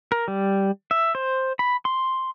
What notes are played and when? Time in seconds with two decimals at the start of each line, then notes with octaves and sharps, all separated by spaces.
0.12 A#4
0.28 G3
0.91 E5
1.15 C5
1.59 B5
1.85 C6